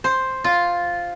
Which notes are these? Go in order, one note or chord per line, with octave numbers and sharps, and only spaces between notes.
C5
F4